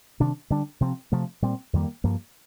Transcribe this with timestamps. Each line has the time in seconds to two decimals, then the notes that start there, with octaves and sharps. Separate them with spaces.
0.20 C3 D#3 G3 D4
0.50 D3 G3 D4
0.81 C3 F3 C4
1.12 C3 F3 A3
1.42 A#2 G3 C4
1.73 F2 D#3 G3 A#3
2.04 G2 F3 A#3